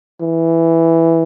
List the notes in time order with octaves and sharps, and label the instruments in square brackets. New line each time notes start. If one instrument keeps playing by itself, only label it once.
[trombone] E3